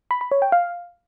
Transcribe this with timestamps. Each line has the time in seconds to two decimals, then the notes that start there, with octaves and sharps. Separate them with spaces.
0.11 B5
0.21 B5
0.31 C#5
0.42 G5
0.52 F5